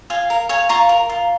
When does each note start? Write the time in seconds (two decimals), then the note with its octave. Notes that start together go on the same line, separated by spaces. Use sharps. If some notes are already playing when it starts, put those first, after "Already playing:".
0.10 F4 F5 G#5
0.30 A#4
0.49 C#5 F5 G#5
0.69 F4 A#5 C#6
0.89 A#4
1.09 F4